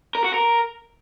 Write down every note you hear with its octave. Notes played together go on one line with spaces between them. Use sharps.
A#4
F#4
A#4